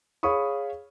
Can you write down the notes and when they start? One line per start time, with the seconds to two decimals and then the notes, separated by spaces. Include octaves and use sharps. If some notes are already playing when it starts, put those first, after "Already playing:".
0.23 G#4 C#5 F5 B5 C#6 D#6